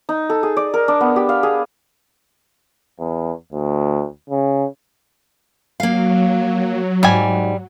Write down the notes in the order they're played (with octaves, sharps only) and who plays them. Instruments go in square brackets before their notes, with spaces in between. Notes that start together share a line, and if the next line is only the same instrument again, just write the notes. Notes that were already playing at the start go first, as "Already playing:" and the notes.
[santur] D#4
A4
G#4
D5
A#4
D4
B3
G4
F5
G#4
[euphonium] E2
D2
C#3
[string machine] F#3 [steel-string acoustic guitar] A#3 F5
[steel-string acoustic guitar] G#2 [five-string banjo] G3 G#5